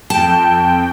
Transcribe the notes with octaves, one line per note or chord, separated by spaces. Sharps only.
F2 G5 A5